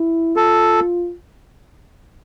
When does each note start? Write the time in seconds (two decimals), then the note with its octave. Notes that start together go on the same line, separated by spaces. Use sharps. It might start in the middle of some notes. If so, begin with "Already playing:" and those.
Already playing: E4
0.35 F4 A4